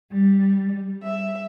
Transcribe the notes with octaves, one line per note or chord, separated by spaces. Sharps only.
G3
E5